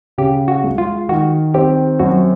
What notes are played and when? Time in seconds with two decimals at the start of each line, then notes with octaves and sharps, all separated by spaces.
0.18 C#3 G4
0.48 F#4
0.64 G#3
0.78 F4
1.09 D#3 F#4
1.54 C4 G4
1.99 F#2 F#4